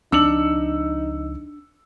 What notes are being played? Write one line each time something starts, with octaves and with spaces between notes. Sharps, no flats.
C#2 F3 C4 D4 D#4 E6 C#7 F#7